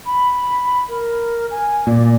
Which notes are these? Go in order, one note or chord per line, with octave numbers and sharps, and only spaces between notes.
B5
A#4
G#5
A#2 D5